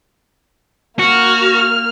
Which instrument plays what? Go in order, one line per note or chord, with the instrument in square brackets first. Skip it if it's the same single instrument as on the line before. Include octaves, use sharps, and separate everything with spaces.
[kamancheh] A#3 F6 [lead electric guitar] F#4